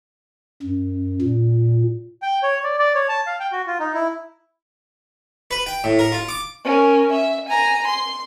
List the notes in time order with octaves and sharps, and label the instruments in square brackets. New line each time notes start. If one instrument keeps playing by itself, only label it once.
[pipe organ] F#2
A#2
[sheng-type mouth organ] G5
C#5
D5
D5
C#5
A5
F5
G5
F#4
F4
D#4
E4
[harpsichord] B4
G5
A2
A#4
F4
D6
[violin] C#4 A#4
E5
G#5 A#5
C6